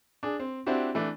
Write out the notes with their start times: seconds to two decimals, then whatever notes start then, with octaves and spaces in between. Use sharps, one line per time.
0.23 D4 G#4
0.40 C4
0.67 C4 D4 E4 F#4 G4
0.95 E3 A3 D4